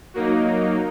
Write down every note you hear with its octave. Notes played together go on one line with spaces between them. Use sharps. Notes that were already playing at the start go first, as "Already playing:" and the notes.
F#3 A#3 D#4